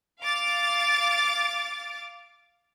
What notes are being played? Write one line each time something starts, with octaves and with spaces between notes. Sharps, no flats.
F5 D6 A6